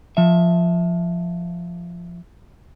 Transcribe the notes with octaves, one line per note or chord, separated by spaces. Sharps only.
F3 E5